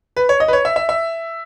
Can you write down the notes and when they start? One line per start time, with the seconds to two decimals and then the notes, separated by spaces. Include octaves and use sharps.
0.17 B4
0.29 C#5
0.40 D#5
0.48 B4
0.53 C#5
0.65 E5
0.76 E5
0.89 E5